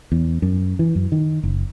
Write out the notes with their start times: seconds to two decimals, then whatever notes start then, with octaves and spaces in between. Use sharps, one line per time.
0.12 E2
0.42 F#2
0.79 E3
0.95 F#2
1.12 D#3
1.43 F#1